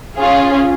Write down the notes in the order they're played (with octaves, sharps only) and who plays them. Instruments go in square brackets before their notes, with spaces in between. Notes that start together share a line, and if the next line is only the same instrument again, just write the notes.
[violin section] C#4 F4 G#4